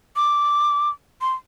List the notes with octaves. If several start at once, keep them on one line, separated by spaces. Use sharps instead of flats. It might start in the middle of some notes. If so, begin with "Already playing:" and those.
D6
C6